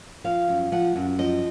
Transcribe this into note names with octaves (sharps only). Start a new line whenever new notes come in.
F3 F5
F#2
F3 F#5
F#2
F3 D#5